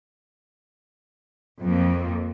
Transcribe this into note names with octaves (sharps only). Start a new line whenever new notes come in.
F2 A#3